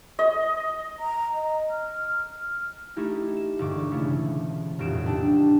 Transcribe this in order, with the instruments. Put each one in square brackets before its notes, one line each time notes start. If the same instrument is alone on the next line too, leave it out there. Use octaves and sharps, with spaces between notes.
[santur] D#5
[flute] A#5
D#5
F6
[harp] A3 D#4 E4 G4
E7
E1 G2 D3 C#6 D6
C#3 A3 C#4 E4
D#1 C2 F2 A2 D7 E7
G#1 D4 G5 A5 E6